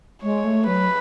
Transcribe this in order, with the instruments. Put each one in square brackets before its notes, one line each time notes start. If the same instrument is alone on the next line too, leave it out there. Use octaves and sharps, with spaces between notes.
[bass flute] G#3 [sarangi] C#5
[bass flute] A3
[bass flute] F#3 [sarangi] B4